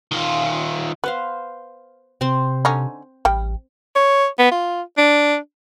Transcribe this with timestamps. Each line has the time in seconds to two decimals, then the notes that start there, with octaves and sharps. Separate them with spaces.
0.12 D#3 F4
1.04 B3 B4 C5 F5
2.21 C3 C4 C5 C6
2.65 D3 C#4 D#4
3.25 A1 G3 G5
3.96 C#5
4.39 B3
4.51 F4
4.98 D4